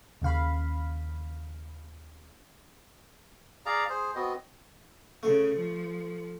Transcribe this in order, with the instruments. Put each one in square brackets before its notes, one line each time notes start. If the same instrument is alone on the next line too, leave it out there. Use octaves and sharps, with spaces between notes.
[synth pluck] D#2 C#3 F5 B5
[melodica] G#4 D5 F5 A#5
G#4 C5
B3 C4 F#4 D#5
[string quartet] C#3 [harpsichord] A3
[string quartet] F3